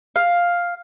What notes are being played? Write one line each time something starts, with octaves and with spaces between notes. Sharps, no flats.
F5